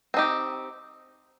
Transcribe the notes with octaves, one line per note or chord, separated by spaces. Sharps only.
C4 D#4 G4